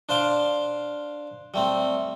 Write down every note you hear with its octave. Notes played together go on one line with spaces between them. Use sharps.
D4 C5 F5 C6 D6
G3 A3 C4